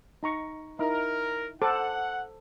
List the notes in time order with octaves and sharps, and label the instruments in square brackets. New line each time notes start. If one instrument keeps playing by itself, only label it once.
[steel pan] D#4 A#5 C#6
[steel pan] D#4 E4 [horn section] A#4
[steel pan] A4 C5 D6 [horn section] F#5